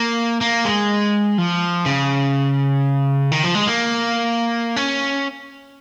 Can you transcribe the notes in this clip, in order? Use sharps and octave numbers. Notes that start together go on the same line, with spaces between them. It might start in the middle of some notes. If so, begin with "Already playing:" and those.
Already playing: A#3
A#3
G#3
F3
C#3
D#3
F3
G#3
A#3
C#4